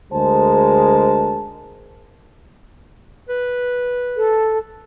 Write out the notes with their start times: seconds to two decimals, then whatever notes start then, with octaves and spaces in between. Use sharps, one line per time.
0.12 D2 G#3 G#4 A#4 C5 A5
3.29 B4
4.17 A4